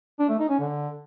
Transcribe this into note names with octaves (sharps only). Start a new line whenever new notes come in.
D4
A3
D#4
C#4
D3